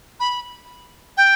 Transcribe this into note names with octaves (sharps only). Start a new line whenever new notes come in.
B5
G5